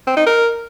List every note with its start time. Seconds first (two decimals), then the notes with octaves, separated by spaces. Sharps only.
0.07 C4
0.17 D#4
0.26 A#4